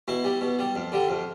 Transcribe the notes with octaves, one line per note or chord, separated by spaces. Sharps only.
B2 E4
G3
B2
G3
F2
D3 G3
F2